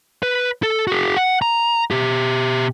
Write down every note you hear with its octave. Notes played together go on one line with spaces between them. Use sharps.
B4
A4
F#4 G#4
F#5
A#5
B2 G4